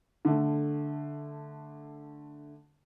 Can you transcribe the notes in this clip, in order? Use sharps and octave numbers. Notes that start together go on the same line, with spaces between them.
D3 A3